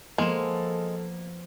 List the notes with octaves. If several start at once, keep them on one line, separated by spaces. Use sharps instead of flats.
F3 G#3 A#3 B3 A4 C6 E7